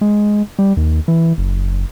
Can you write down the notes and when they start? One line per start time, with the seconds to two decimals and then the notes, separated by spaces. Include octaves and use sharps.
0.01 G#3
0.59 G3
0.77 D#2
1.08 E3
1.38 F#1